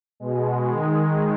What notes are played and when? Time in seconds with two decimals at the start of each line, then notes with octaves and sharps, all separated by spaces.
0.20 B2 G#3
0.70 D#3 G#3